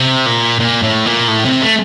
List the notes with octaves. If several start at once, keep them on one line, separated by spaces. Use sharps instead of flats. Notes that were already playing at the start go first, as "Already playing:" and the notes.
Already playing: C3
A#2
A#2
A2
A#2
A2
C3
A3